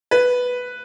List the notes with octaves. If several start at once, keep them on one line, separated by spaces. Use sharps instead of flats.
B4